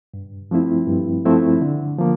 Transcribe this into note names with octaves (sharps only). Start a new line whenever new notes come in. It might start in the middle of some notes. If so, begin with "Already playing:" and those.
G2
F3 A3 C4 E4
G2
F3 A3 C4 E4
D3
F3 A#3